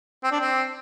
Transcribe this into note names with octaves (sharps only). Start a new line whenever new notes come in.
C4
D4
C4